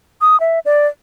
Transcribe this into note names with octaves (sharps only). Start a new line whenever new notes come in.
D#6
E5
D5